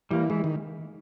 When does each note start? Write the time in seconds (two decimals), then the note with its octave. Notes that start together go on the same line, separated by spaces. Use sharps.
0.11 E3 G3 A#3
0.30 E3 G#3
0.44 D#3